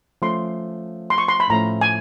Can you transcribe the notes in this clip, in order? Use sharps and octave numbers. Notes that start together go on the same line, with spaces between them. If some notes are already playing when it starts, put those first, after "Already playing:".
F3 A3 C#4 C6
C6
C#6
C6
B5
A2 F3 A3 C#4 A#5
G#5